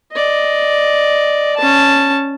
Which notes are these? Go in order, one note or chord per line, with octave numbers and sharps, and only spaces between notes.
D5 D#5
C#4 A5